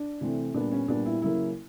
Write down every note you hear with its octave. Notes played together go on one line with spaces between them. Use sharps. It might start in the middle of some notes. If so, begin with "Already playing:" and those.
Already playing: D4
C3 E3 A3 C4
A#2 G3 B3 D4
C#4
A#2 G3 B3 D4
E4
C#3 F#3 A#3 C#4 E4